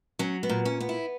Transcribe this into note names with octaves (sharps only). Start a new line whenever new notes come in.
F#3 C#4
B3
A#2
C#4
B3
E4